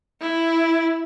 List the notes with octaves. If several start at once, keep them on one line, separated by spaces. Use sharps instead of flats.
E4